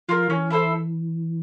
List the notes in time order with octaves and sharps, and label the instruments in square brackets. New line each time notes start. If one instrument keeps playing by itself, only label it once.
[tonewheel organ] F3 [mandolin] F4 A#4
[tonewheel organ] E3 [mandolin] C#4
[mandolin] E4 A4 C5